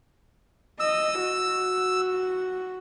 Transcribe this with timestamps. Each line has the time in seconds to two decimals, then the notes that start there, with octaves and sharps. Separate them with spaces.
0.80 D#5 E6
1.20 F#4